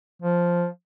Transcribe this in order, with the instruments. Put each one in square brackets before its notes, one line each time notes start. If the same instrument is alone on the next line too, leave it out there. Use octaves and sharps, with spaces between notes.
[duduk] F3